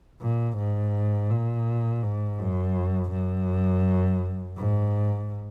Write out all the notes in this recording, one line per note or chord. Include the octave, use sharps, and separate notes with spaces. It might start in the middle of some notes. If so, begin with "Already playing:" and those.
A#2
G#2
A#2
G#2
F#2
F#2
G#2